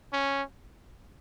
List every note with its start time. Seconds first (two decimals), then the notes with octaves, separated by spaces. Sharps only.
0.13 C#4